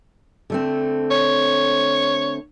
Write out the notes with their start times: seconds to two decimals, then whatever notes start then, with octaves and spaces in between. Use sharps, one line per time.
0.50 D3 A3 C4
1.11 C#5